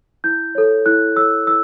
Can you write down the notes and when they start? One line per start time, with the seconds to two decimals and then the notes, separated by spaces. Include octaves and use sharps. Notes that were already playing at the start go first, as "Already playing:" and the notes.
0.24 E4 G6
0.55 A4 C#5
0.86 E4 F#6
1.16 A4 C#5 E6
1.47 E4 E6